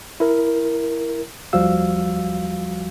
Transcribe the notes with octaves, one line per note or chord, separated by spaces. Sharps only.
E4 A#4
D#2 F3 G3 F#4 F5 E6